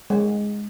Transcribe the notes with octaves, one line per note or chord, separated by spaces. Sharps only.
G#3